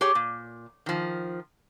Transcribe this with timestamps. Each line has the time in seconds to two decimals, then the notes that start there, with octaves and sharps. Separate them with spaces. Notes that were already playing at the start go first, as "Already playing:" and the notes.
0.01 G4 G#4 C#5
0.15 A#2
0.86 D#3 F3